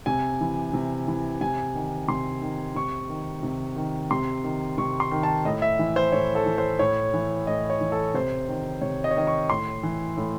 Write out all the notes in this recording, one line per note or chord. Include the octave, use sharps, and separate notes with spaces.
C3 G#5
E3
C3
E3
C3 G#5
D#3
C3 C6
D#3
C3 C#6
D#3
C3
D#3
C3 C6
D#3
C3 C#6
C6
D#3
A5
A2 D#5
E5
E3
C5
A2 C#5
A4
E3
C5
A2 C#5
E3
A2 D#5
C#5
E3
A4
C3 C5
D#3
C3 C#5
D#5
C#5
D#3 D#5
C#6
A2 C6
E3
A2